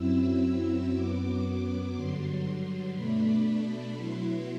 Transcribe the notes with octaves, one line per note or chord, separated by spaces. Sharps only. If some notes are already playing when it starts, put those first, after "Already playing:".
Already playing: F#2 F#3 C4 E4 E6
F#2 F#3 B3 D6
D6
G2 D3 F#3 C6
B2 A3 D4 B5
B2 F#3 B3 E4 C6